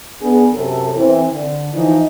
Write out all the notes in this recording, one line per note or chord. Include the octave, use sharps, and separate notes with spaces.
B3 D4 G#4
F#2 C3 A4
E3 C4
D3
E3 F3 D#4